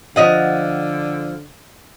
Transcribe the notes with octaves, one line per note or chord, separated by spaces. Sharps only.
D3 F3 D#5 F#5